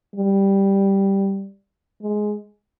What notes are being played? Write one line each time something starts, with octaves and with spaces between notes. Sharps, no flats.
G3
G#3